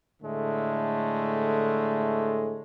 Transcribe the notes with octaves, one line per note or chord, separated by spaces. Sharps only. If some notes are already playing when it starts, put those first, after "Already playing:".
A2 D3 G#3 A3